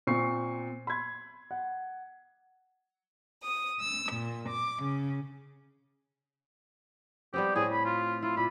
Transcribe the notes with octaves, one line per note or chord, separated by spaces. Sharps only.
A#2 C4 C#6 C7
B5 C6 G#6
F#5
D#6
E6
A#2
D6
C#3
G3 B3 C4 G4
A2 C4 G#4
B5
F4
E4 F4
A#2 B5